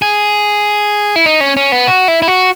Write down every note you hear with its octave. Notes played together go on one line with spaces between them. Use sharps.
G#4
E4
D#4
C#4
C#4
B3
F#4
E4
E4
F#4